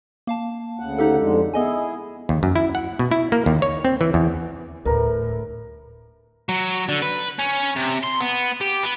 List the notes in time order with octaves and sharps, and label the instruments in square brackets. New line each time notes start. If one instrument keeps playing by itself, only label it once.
[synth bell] A#3 F5 A5
[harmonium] D2 C#3 F#5
[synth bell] D#4 G4 A4
[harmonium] F2 D3 G#3
[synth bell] B3 D#5 G#5 [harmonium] E4 G#4
[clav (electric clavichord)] D#2
F#2
E4
F#5
B2
E4
A#3
D#2
C#5
C4
E3
E2
[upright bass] D#1 D2 [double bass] A2 [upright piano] A#4 B4 A#5
[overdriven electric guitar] F#3
D3
B4
C#4
C3
C6
B3
G4
B3